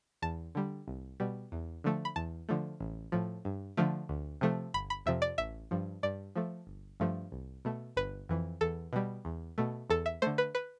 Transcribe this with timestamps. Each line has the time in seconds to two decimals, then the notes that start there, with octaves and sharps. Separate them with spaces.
0.22 E2 A5
0.55 D3 G3
0.88 C2
1.20 B2 G3
1.52 E2
1.84 D3 F3 A3
2.05 B5
2.16 E2 A5
2.49 D3 F3 A3
2.80 A1
3.12 A2 F3
3.45 G2
3.77 D3 F3 A3
4.09 D2
4.41 C3 F3 A3
4.74 G1 B5
4.90 B5
5.06 F2 C3 F3 E5
5.22 D5
5.38 A1 E5
5.71 G2 F3
6.03 G2 D5
6.36 F3 A3
6.67 G1
7.00 G2 F3 A3
7.32 C2
7.65 B2 A3
7.97 G1 B4
8.29 F2 E3
8.61 E2 A4
8.93 B2 G3
9.25 E2
9.58 B2 A3
9.90 E2 A4
10.06 E5
10.22 D3 A3 C5
10.38 B4
10.55 B4